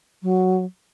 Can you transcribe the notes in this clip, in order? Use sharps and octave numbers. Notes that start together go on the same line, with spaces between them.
F#3